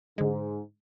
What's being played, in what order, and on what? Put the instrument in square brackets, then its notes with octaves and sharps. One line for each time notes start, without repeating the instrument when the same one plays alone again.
[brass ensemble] G#2 [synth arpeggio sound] D3 G#3